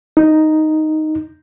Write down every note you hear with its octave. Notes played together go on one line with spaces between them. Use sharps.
D#4